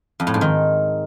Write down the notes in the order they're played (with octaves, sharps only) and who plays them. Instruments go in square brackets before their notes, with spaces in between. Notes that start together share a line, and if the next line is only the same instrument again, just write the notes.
[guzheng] F2
A2
G#2
D#3